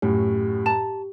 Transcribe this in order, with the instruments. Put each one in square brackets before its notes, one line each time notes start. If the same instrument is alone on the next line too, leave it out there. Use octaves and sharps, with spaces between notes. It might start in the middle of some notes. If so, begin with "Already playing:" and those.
[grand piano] F#2 A2 [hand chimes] G4
[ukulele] A5 A#5